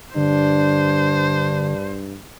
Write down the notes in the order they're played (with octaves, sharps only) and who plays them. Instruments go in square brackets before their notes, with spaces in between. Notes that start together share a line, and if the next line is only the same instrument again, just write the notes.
[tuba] G2 [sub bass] D3 [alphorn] D4 [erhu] C5